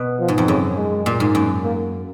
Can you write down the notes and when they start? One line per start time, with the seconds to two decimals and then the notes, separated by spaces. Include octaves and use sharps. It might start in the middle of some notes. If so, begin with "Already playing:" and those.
Already playing: B2
0.19 F3
0.28 G#2
0.38 F2
0.47 F#2 C#3
0.77 G#3
1.06 A#2
1.20 G#2
1.35 F#2
1.64 A#3